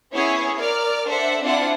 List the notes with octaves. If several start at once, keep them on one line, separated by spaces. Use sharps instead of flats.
B3 C#4 E4 G#4 C#5
A#4 D5 F6
D4 A4 C5 E5 F#5
C4 D4 E4 F4 F#5